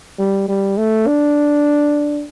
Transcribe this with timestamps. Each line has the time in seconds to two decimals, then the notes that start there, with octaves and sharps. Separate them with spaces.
0.19 G3
0.49 G3
0.77 A3
1.07 D4